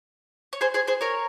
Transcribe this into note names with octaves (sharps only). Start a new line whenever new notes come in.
C#5
G#4 C5
G#4 C5
G#4 C5
A#4 C#5